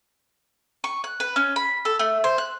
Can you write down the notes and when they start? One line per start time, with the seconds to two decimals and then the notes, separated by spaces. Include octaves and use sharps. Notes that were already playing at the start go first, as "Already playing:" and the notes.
0.84 C#6
1.04 F#6
1.20 B4
1.36 C#4
1.56 B5
1.85 A4
1.99 A3
2.24 C5
2.38 F#6